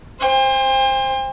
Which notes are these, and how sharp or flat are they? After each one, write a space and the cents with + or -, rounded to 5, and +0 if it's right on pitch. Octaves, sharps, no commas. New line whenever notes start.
C5 +10 G5 +45